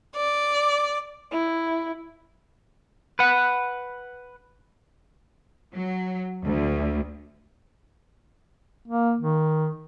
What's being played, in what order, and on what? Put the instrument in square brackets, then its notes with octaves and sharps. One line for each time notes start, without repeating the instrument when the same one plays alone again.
[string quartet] D5
[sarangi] E4
[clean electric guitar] B4 F#5
[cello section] F#3
D2
[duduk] A#3
D#3